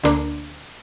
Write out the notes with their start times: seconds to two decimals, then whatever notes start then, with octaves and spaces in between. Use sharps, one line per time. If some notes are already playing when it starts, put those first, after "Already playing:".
0.04 D2 D3 A#3 D4